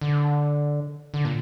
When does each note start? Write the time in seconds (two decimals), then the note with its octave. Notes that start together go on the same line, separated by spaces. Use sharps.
0.01 D3
1.14 D3
1.25 A#2